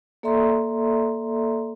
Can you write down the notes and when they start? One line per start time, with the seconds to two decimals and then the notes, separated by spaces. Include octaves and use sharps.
0.23 A#3 A4 D5 E5 A#5 C6